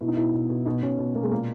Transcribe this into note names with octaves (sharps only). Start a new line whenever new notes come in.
B2 E4
D#4
B2 E4
B2
B2
B2 D#4
B2 C#4
B2
B2 A#3
G#3
A#2 A#3